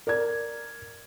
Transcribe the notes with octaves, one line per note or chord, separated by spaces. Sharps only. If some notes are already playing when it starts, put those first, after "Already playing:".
A#4 D5 G#6